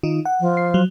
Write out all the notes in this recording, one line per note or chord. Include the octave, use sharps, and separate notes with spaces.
D#3 D#4 F4
F#5
F3
C7
F#3